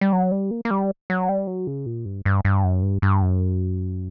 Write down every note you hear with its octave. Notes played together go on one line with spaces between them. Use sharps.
G3
F#3
G3
A#3
A#3
G3
F#3
G3
F#3
C#3
A#2
G2
G2
G2
F#2
G2
G2
F#2